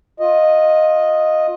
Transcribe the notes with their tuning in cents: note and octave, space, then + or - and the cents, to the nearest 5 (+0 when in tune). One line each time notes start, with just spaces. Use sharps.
F4 +20 D#5 +0